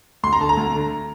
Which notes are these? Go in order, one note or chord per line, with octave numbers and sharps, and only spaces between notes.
D2 C6
A#5
D3 A5
A#5
D2
D3